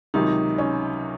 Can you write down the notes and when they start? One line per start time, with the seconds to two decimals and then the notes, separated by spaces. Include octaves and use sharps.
0.14 C#2 C3 D#3 F#3 D#4
0.58 C#4